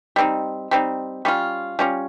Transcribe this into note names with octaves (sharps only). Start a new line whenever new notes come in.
G3 C4 D#4
G3 C4 D#4
G3 C#4 F4
G3 C#4 F4